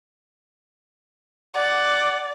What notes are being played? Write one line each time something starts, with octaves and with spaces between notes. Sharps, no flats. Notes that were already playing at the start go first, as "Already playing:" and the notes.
D5 F#5